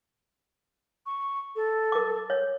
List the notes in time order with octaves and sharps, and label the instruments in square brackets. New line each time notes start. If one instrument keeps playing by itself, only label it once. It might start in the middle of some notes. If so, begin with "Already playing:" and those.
[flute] C#6
A4
[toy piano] A#4 D6
C#5